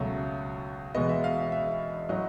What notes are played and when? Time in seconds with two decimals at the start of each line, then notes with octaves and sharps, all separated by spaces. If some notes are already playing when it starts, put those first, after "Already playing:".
Already playing: C#2 B2 F#3 A3
0.94 E2 B2 G#3 B3 D#5
1.09 E5
1.24 F5
1.38 E5
1.52 E5
2.09 A2 F#3 D#5